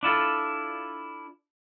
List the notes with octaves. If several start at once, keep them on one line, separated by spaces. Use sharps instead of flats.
D4 E4 F4 A4